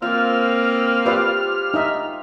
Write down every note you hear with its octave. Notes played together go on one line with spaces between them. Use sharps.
A#3 C4 F4 F5 F6
F4 G4 B4 C5 D5 F5
D#4 D#5 E5